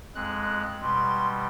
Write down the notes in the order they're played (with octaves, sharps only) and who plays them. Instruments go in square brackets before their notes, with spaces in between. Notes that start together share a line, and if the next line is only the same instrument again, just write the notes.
[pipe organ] F2 G#3 F#6
[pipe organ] B2 G3 [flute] C6